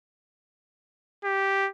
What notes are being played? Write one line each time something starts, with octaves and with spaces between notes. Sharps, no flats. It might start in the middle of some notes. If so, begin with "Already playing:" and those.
G4